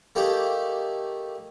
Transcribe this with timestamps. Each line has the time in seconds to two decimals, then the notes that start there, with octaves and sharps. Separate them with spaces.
0.15 A3 A#3 D#4 G4